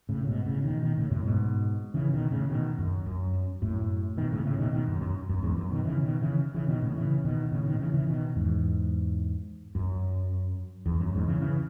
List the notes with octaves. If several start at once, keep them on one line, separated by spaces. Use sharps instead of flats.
A2 C#3
C#3
G#2 B2
A2 C#3
B2 D#3
B2 D#3
A2 C#3
F#2 A2
G#2 B2
C#3 E3
B2 D#3
A2 C#3
B2 D#3
F#2
F#2
F#2 A2
B2 D#3
A2 C#3
A2 C#3
B2 D#3
B2 D#3
F#2
F#2
F#2
E2 G#2
F#2
B2 D#3
C#3 E3
B2 D#3
C#3 E3
C#3 E3
B2 D#3
A2 C#3
C#3 E3
B2 D#3
A2 C#3
B2 D#3
C#3 E3
C#3 E3
B2 D#3
E2 G#2
F#2
E2
F#2
E2 G#2
C#3 E3
C#3 E3